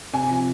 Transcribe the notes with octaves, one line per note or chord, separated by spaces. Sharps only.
C3 G#5
F3